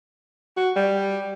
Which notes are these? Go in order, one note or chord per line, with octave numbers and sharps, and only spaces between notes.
F#4
G3